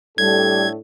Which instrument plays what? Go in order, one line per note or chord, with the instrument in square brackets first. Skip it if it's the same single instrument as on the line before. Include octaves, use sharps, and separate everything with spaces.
[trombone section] A2 D4 A4 [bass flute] G3 [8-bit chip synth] G#6